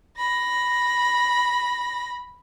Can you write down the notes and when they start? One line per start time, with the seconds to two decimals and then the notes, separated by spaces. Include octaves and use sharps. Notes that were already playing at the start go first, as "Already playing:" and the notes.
0.18 B5 A#6